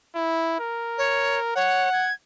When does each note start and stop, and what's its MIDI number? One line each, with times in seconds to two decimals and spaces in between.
0.15 0.56 64
0.59 1.54 70
0.98 1.39 73
1.56 1.89 73
1.56 2.10 78
1.93 2.12 92